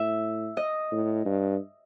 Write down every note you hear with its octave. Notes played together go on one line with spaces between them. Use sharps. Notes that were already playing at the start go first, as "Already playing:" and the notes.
Already playing: A2 E5
D#5
A2
G2